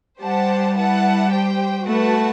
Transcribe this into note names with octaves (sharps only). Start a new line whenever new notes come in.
G3 G4 C5 F#5 A5
E4 B4 F#5 A5
G4 C5 G5
A3 F#4 B4 F#5 A5